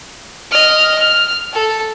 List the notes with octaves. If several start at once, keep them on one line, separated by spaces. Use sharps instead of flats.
D#5 F6
F6
A4